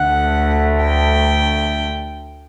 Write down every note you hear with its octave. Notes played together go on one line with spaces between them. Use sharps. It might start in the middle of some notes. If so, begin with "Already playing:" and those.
Already playing: D2 D3 A3 F#5
G5